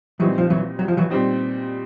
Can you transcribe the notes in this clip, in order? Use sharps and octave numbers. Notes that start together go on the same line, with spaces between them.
A#2 E3 F#3 G3 C4 D#4
F3
E3 F#3
F#3
F3
E3 F#3
A#2 G3 C4 D#4